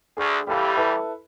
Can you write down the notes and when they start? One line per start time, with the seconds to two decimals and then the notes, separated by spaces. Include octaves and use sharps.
0.17 D2 G#4
0.47 A1 E3 G3 G4 A4 F5
0.77 E4 A4 B4